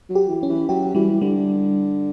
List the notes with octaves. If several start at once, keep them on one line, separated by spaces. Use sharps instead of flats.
F#3
G4
E3
C#4
E3
F#3 G4
E3 G3
D3 G3